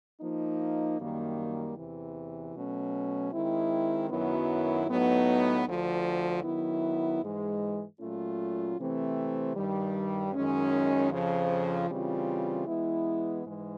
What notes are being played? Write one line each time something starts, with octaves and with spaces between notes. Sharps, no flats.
F3 A#3 D#4
F#2 D#3 G3 A#3
E2 C3 E3
B2 F#3 A3 C#4
D#3 G#3 C4 E4
F#2 D#3 F#3 B3 E4
A2 F#3 B3 D#4
D2 D3 F3
D#3 F#3 B3 E4
G#2 E3 G#3
A#2 F#3 A3 C#4 F4
C3 E3 A3 C4
G2 D#3 G3
F#2 D#3 G#3 C#4
F2 C#3 F3
C#3 E3 G3 C4 F4
E3 G#3 B3 E4
G#2 E3 G#3